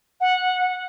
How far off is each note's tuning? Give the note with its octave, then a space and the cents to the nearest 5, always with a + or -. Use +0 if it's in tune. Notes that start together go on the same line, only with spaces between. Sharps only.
F#5 -15